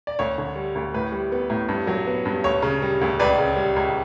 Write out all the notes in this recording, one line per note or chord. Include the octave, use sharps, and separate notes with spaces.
D5
D2 C#5
D3
G3
D2
A2 B4
G3
B3
A2
G2
F#3
B3
G2
D2 C#5
C#3
G3
D2
C#2 B4 D5
C#3
G3
C#2